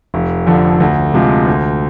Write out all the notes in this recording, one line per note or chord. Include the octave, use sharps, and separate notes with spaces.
F1
F2 D3 F3
D2
C3 F3 G#3
D2